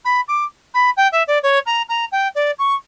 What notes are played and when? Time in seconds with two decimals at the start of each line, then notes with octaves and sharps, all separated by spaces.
0.05 B5
0.28 D6
0.74 B5
0.97 G5
1.12 E5
1.27 D5
1.43 C#5
1.66 A#5
1.89 A#5
2.12 G5
2.35 D5
2.58 C#6